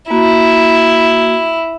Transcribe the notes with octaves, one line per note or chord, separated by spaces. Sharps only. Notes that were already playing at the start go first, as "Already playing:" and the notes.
A#3 E4 F#4